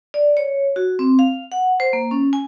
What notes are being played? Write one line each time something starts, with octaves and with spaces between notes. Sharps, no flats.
D5
C#5
F#4
C4
F5
F#5
C5
A#3
C#4
G#5